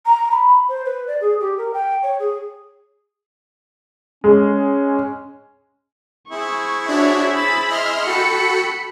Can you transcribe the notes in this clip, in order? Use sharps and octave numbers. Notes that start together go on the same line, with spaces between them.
A#5
B5
C5
B4
D5
G#4
G4
A#4
G5
C#5
G#4
G#3 C#4
C4 E4 G#4 C#6
D4 F#4 C#5 E5
B5 A6 E7
D#5 E5 C6 F6
F#4 A4 G5 B5 C#7